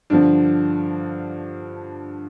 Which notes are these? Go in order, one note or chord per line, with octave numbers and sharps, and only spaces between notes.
G2 D3 F3 D4